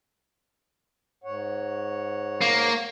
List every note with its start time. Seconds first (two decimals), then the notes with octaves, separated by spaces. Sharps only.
1.24 G#2 C#5 F#5
2.41 A#3